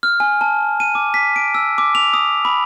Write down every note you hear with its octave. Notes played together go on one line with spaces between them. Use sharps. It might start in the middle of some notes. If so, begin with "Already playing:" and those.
F6
G#5
A5
D#7
D6
B6
D7
E6
D6
F7
D#6
B5